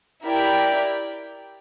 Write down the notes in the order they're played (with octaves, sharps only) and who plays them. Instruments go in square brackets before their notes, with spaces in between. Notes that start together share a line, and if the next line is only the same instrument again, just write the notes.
[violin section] E4 G4 A#4 D5 G5